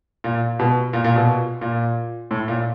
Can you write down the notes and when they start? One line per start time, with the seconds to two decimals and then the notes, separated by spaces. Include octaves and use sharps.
0.24 A#2
0.59 B2
0.93 A#2
1.04 A#2
1.16 B2
1.61 A#2
2.31 A2
2.48 A#2